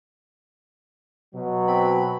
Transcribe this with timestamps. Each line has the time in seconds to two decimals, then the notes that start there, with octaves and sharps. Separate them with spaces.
1.34 B2 F#3
1.68 C4 B5